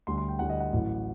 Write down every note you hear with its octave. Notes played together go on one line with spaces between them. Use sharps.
D2 D3 G3 C6
C6
G5
D2 D3 G3 F#5
D#5
F#5
A1 A2 F#3